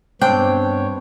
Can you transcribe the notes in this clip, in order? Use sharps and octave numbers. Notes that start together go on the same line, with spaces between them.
G2 B3 C4 D4 C#5 G5